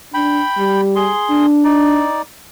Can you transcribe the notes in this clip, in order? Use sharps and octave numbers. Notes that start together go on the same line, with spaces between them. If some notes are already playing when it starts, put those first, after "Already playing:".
D4 G5 B5
G3
G#4 C6
D4
D#4 D5